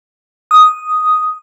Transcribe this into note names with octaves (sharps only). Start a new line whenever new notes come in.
D#6